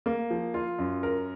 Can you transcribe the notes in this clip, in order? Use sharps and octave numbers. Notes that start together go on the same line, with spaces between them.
A#3
F3
F4
F#2
A#4